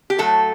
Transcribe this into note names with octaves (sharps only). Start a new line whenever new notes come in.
G4
A2 F#3 A3 A4